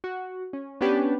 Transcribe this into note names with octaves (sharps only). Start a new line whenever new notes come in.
F#4
C#4
B3 C#4 D4 G4 B4